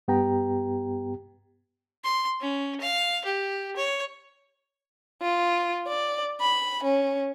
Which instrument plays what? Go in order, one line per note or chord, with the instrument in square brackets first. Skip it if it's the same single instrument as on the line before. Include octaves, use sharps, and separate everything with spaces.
[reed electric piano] G2 B3 G4 G5 A#5
[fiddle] C6
C#4
F5
G4
C#5
[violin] F4
D5
B5
C#4